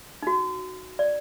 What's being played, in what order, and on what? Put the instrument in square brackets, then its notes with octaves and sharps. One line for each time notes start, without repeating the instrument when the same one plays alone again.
[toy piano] D#4
F#4
D5